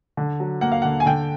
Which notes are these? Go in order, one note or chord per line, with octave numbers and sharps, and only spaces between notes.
D3
F#3
A#3 F#5
F5
D3 F#5
G#5
D3 G5